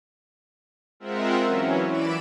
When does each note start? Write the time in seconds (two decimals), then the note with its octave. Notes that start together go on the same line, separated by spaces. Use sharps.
1.00 G#3 C4 F4 A#4 E5 F#5
1.44 E3 F#3 C#4
1.89 E3 D5 B5 D7 E7